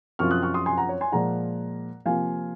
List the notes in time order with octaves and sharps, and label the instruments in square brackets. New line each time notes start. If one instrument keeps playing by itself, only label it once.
[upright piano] F#2 F3 C4 F4 C#6 F6
D#6 F#6
C#6 F6
C6 D#6
G#5 C6
F#5 A#5
C#5
G#5 C6
A#2 F3 G#3 F#5 A#5
C3 F3 A#3 F4 F5 G#5